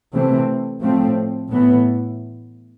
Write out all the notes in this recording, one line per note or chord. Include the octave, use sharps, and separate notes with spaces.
C3 E3 A3 C4
A2 F3 A3 C4
A2 E3 B3